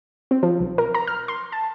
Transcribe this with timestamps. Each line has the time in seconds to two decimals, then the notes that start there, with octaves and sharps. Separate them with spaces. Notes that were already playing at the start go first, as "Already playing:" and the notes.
0.31 C4
0.43 F3
0.60 B1
0.78 A#4
0.95 A#5
1.07 F6
1.28 C6
1.52 A5